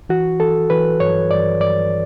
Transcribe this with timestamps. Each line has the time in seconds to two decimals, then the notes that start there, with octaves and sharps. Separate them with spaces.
0.09 E3 F#4
0.40 E3 A4
0.70 E3 B4
1.00 G2 C#5
1.31 G2 D5
1.61 G2 D5